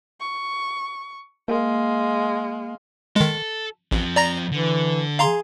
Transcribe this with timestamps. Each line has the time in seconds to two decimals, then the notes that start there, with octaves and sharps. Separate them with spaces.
0.20 C#6
1.48 G#3 A#3 F5
3.16 D#3 G#3 A4
3.92 A1 F3 C4
4.16 D5 A#5 A#6
4.52 D3 E3
5.19 G#4 F5 A#5 C6